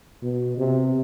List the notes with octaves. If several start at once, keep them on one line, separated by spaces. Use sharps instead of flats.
B2
C3